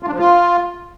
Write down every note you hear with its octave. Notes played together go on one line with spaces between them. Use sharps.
F4
D4
F3
F4